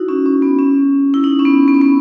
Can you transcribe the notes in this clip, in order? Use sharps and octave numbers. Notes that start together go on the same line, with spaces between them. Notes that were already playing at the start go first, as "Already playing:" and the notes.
Already playing: D#4 E4 F#4
C#4
C#4
B3
C#4
E4
D#4
C#4
B3
B3
C#4
B3